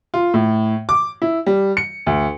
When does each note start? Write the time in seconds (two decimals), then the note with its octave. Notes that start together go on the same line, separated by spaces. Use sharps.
0.14 F4
0.34 A2
0.89 D6
1.22 E4
1.46 G3
1.77 C#7
2.07 D2